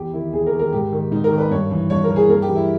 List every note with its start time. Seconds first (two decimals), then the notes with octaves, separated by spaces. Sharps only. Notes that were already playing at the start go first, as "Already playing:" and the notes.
Already playing: E2 G4
0.14 D#3 E4
0.33 E2 G#4
0.47 A#4
0.53 D#3
0.59 A#4
0.73 G#2 G4
0.93 D#3
1.11 G#2 D#4
1.24 A#4
1.31 D#3
1.38 B4
1.50 G2 C#5
1.71 E3
1.90 G2 C#5
2.04 A#4
2.10 E3
2.16 G#4
2.29 G2 A#4
2.42 G4
2.49 E3
2.55 E4